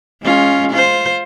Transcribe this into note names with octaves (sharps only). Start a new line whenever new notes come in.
G#3 C#4 F4
F4 C5